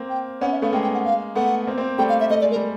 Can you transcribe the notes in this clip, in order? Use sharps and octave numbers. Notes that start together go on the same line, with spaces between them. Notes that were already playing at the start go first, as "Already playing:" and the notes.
Already playing: A#3 C4
G5
B3 C#4 F#5
E5
A3 B3 F5
G#3 A#3 G5
G5
F#5
F5
A3 B3 F#5
A#3 C4
A#3 C4
G3 A3 G5
F5
E5
A3 D#5
G#3 D5
A#4
G3